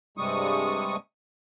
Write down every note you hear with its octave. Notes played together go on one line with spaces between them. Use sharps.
G2 C3 G3 G#3 C#6 D#6